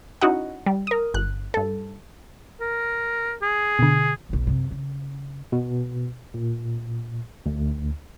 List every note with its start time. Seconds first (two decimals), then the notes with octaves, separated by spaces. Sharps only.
0.21 C#4 D#4 E4 F#4 D#5 F#5
0.66 G3
0.87 A#4 D#6
1.14 G1 F#6
1.54 G2 A4
2.60 A#4
3.42 G#4
3.79 B2 D3
4.29 F#1 B1
4.47 F#2 C3
4.71 C#3
5.52 B2
6.34 A#2
7.46 D2